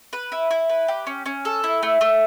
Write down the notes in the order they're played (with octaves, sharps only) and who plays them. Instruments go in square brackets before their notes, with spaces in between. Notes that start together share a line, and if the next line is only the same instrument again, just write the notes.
[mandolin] B4
E4
E4
B4
G4
C#4
C#4
A4
E4
A3
A3